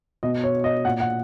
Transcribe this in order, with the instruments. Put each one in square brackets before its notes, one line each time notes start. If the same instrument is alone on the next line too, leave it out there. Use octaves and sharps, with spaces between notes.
[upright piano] B2 D#5
C#5
D#5
A#2 F#5
F#5